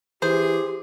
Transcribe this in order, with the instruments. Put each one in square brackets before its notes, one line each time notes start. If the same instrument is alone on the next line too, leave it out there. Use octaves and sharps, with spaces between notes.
[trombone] E3 [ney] G4 [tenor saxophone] G#4 [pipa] C5